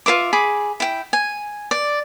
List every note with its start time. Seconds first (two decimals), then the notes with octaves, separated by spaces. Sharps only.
0.06 F4 C5 E5 D6
0.33 G#4 B5 D6
0.80 E4 G5
1.13 G#5
1.71 D5